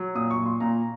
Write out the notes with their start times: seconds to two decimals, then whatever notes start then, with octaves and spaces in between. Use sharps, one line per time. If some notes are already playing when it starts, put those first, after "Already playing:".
Already playing: F#3
0.15 A#2 D#6
0.31 C#6
0.37 A#2
0.46 C6
0.60 A#2 A#5